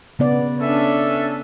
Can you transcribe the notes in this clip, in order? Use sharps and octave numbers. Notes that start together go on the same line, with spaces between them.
C#3 B3 D5
C#4 D4 A4 E5